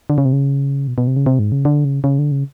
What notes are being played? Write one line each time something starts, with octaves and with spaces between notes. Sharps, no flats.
D3
C#3
C3
C#3
B2
B2
C3
C#3
C3
G#2
C#3
D3
C#3
C#3
D3
C#3